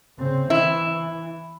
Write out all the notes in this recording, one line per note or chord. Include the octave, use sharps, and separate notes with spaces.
C#3 C4
E3 E4